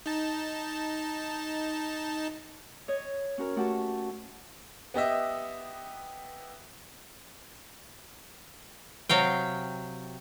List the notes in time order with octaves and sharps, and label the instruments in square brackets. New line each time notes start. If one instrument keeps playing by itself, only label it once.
[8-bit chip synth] D#4 A5
[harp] C#5 D#5
C#4 F#4 A#4
A3 F#4 G4 F#5 A5
[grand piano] B3 G4 D#5 E5
[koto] C3 F#3 F5 G5